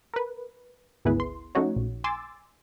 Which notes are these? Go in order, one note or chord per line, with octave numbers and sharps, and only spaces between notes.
A#4 B4
G#1 D2 B3 E4 G#4 B4
C6
F3 A3 C#4 D#4 F#4 C#5
A#1
G#5 C6 D6 E6 A6